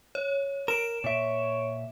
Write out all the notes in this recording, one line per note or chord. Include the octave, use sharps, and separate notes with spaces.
C#5
A#4 D7 E7
A#2 C#5 E5